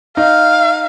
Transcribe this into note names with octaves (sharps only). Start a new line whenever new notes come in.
D#4 F5